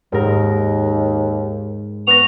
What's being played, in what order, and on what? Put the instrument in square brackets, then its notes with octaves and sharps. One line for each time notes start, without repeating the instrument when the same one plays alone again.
[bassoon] D#2 [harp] G#2 A#4
[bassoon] B3 [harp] C#6 F#6 A#6 [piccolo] F7